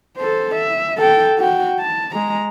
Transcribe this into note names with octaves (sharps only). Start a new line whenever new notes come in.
A4 C5
E5
A4 G5
F#4 G5
A5
G#3 A#5